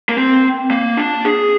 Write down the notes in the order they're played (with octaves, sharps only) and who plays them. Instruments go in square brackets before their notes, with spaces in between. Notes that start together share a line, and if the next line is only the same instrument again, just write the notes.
[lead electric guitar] A#3
C4
A#3
D4
G#4